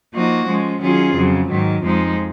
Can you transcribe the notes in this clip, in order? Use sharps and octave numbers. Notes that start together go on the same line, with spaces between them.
F3 A#3 D#4 F#4
F3 G#3 C#4
D#3 F#3 C#4 F4 G#4
F2 C#3 F#3
G#2 D#3 F#3
F2 F3 G#3 D#4